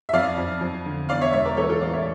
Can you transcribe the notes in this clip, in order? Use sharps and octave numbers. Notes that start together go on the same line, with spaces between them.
E5
F2 D5 F5
F2
F2
D3
E2 D5 F5
C#5 E5
E1 C#5 E5
A#4 D5
E3 A4 C#5
A#4
F4 A4
A1 D5 F5
C#5 E5